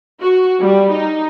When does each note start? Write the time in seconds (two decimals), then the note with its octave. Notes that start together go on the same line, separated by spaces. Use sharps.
0.20 F#4
0.60 G3
0.90 D#4